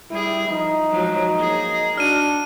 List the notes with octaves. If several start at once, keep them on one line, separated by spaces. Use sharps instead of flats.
G3 E4 G#4
F3 D#4
F3 F#3 G#3
A#3 G#4
D4 F#4 F6 D#7